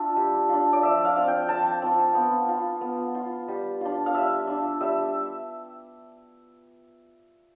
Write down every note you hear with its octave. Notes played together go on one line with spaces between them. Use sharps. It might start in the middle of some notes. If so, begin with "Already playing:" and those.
Already playing: D4 F4 E5
G3
D4 F4
D5
F3 E5
F5
C4 F4
G5
F3 A5
C4 F4
B3
F4
B3
F4
G3
D4 F4
F5
G3 E5
D4 F4
G3 E5